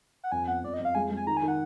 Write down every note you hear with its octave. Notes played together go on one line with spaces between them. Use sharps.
F#5
F2 G#5
B3 F#5
F2 D5
D#5
F2
F5
G#3 G#5
G#3
G#5
D#3 A#5
G#5
D#3
F#5